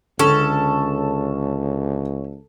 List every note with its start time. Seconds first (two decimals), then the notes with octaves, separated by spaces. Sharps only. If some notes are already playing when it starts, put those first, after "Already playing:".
0.19 C#2 D3 C#4 A4